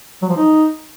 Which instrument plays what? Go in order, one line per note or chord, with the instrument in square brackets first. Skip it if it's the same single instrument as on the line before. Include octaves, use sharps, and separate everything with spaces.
[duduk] F#3
F3
D#4